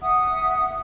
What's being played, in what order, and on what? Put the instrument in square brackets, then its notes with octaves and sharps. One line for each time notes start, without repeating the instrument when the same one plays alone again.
[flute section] E5 F#5 D#6